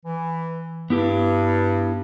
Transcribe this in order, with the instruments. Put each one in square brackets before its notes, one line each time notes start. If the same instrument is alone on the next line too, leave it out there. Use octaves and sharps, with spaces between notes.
[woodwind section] E3
[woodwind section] G2 [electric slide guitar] B3 E4 G4